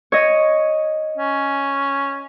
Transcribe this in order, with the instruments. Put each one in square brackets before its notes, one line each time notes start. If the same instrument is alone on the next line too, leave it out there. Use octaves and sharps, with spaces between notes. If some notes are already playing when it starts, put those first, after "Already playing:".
[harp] C#5 D#5
[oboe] C#4